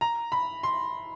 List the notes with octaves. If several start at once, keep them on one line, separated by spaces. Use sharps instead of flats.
A#5
B5
C6